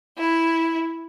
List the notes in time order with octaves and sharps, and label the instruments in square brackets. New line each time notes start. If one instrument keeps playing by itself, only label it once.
[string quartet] E4